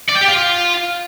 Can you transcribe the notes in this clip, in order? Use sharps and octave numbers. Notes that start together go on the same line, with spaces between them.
D5
G5
G4
F4